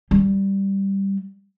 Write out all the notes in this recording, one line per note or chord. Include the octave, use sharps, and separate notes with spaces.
G3